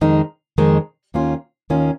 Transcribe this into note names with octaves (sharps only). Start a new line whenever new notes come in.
F2 D#3 G#3 D#4
F2 D#3 G#3 D#4
D#2 D#3 A#3 C#4 F4
D#2 D#3 A#3 C#4 F4